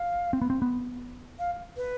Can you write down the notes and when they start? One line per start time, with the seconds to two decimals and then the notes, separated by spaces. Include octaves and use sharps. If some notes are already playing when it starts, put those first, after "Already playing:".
Already playing: F5
0.33 C4
0.42 B3
0.50 C4
0.62 B3
1.39 F5
1.77 B4